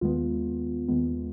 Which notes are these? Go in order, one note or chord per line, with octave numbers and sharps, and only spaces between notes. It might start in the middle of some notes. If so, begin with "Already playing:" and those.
D#2 D#3 G#3 B3 F4
D#2 D#3 G#3 B3